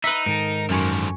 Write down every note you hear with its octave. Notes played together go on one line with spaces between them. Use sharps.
D#4 B4 E5
G#2 D#3 A4 A#4
F#2 D3 F3 G#5 C#6